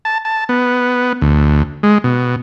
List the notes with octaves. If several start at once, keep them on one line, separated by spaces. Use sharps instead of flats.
A5
A5
B3
D2
G#3
B2